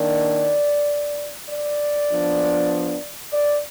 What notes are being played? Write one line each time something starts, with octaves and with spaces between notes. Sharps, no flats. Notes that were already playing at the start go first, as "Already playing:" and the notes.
Already playing: D#3 A#3 D4 D5
D5
F3 B3 D4
D5